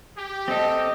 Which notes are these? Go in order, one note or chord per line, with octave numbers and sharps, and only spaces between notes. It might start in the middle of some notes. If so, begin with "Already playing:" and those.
G4
C4 A4 D#5